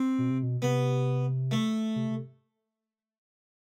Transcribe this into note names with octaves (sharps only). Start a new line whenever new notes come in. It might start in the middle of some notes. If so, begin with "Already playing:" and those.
Already playing: C4
B2
C3
B2
C3 B3
A3
C3
C3